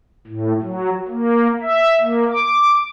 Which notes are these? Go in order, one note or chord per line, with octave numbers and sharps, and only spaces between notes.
A2
F#3
A#3
E5
A#3
D6